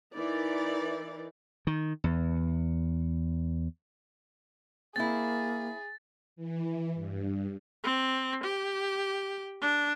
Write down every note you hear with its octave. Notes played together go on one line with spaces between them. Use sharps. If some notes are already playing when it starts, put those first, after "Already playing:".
E3 D#4 A#4 D5
D#3
E2
A#3 C4 E4 G#4 A6
E3
G2
C4
G4
D4